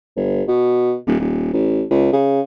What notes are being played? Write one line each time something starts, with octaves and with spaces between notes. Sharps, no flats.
G1
B2
D#1
D#1
A1
C#2
C#3